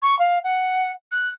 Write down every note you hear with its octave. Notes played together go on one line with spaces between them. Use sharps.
C#6
F5
F#5
F#6